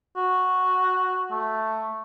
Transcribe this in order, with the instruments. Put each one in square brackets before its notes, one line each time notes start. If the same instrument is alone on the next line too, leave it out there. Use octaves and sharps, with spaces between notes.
[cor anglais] F#4
A3